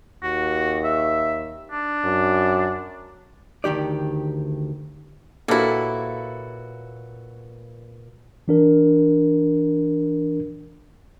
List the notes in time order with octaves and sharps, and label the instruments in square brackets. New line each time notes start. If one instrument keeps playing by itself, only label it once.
[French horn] D#2 [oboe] F#4
[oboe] E5
D4
[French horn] F#2
[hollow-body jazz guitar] D2 D#3 G4 D5
[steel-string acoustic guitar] A#2 B4 C#5 [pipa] A#3 E4 [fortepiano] F#4 A4
[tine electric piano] E3 D4 A#4